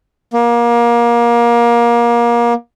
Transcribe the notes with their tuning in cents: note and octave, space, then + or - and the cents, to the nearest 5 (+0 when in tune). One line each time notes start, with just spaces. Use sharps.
A#3 +25